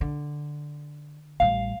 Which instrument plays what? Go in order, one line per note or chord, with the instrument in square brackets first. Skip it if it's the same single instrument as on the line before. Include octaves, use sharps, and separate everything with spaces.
[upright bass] D3
[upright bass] A1 G3 [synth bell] F5